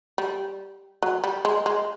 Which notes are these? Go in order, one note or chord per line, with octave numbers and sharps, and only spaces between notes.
G3
F#3
G3
G#3
G#3